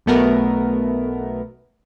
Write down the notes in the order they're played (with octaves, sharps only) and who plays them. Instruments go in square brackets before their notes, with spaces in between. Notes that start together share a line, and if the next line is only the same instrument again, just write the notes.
[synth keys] B1 B2 A3 B3 A#4